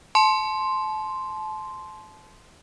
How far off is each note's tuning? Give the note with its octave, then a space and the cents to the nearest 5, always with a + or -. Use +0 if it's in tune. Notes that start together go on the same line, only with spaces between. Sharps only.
A5 -30 C6 +0